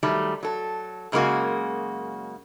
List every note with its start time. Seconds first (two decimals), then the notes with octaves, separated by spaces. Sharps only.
0.03 D#3 F#3 G3 A3
0.43 F#3 A4
1.12 F#2 C#3 G#3 A#3 F#4